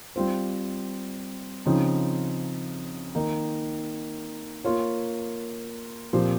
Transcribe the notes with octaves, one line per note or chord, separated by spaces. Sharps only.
G3 C4 F4 C5
C#3 F3 C4 D#4
D#3 A#3 D#4
A#3 F4 A#4 C#5
A#2 F3 C4 G4 C5